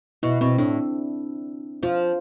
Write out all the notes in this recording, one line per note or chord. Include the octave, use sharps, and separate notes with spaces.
B2 E4
B2 C4
A2 D4
F3 F4